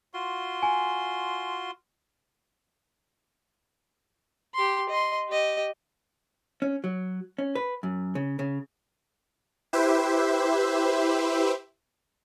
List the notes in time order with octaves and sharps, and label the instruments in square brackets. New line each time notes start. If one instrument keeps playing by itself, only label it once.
[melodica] F4 F#4 C6
[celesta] G#5
[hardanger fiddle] G4 C6
D#5 C6
G4 D#5
[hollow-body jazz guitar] C#4
F#3
C#4
B4
F#2
C#3
C#3
[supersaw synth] E4 G4 B4 C5 E5